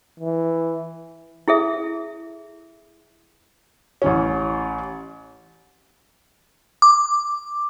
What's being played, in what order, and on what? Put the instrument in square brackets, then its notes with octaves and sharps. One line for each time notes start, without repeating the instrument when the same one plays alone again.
[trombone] E3
[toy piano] E4 G#4 A4 E5
[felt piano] A1 E3 C#4
[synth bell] D6